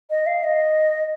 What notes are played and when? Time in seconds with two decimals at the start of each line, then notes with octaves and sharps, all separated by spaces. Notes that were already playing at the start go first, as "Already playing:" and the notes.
0.10 D#5
0.26 F5
0.43 D#5